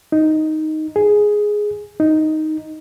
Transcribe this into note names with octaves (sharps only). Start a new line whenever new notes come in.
D#4
G#4
D#4